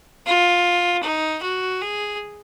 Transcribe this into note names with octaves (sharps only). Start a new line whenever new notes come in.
F4
D#4
F#4
G#4